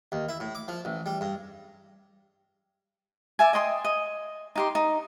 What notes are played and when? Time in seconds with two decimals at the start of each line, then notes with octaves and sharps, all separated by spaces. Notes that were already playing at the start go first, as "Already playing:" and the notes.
0.12 D#2
0.29 E4
0.40 A2
0.55 D6
0.68 F3
0.85 A1
1.06 G3
1.21 G2
3.39 D5 E5 G#5
3.53 D#5 G5 C6 D#6
3.84 D#5
4.56 D#4 G4 C6
4.75 D#4